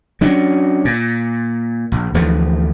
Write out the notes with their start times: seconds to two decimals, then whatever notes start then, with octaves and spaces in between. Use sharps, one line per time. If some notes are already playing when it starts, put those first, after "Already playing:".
0.21 F#3 C#4 D4
0.85 A#2
1.92 A#1
2.14 D2 E3 F3 A3